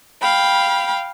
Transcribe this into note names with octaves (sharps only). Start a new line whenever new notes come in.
F5 G5 B5